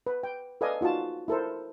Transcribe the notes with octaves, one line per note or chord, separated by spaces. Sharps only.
B4
G5
A4 B4 D5 D#5 F5 G#5
D#4 F4 F#4 A5
E4 A4 A#4 C5